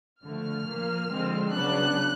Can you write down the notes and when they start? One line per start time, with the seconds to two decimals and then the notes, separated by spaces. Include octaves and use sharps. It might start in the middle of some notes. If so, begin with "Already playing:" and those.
0.23 D3 F3 A3 F6
0.66 A#2 F3 A#3
1.09 D3 F3 G#3 C4
1.52 C#3 F#3 B3 D4 F#6